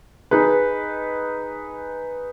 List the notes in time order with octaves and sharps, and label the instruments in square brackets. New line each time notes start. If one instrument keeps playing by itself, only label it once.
[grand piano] D#4 G#4 B4